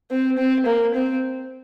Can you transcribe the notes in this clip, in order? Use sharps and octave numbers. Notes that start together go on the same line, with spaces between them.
C4
C4
A#3
C4